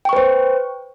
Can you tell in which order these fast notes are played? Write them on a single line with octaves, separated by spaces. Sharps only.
G5 C#6 B4 C5